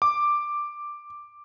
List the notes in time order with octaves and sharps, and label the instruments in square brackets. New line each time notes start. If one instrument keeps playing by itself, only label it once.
[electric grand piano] D6